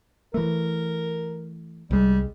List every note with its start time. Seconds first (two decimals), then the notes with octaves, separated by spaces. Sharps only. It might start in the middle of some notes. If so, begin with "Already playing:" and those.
0.34 E3 A3 A#4
1.91 C2 G3 G#3